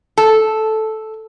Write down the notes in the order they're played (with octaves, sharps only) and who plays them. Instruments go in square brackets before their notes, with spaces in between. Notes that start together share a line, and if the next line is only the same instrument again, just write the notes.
[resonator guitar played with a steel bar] A4